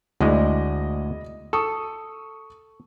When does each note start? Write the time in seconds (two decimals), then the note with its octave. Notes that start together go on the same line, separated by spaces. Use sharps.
0.20 D2 G#3 E4 D5 D#5
1.53 A4 C#6 D#6